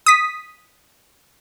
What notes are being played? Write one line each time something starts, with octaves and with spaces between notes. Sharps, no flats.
D#6 B6